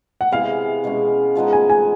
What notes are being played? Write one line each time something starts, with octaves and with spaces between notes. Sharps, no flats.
F#5
C3 E3 G#3 B3 F5
B2 G#3 C#4
F3 G#3 B3 D#4
G#5
G#5